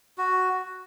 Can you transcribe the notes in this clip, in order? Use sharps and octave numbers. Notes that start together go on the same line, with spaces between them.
F#4